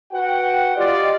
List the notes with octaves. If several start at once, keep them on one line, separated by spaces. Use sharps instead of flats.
F#4 B4 F#5 G5
F4 G4 D5 D#5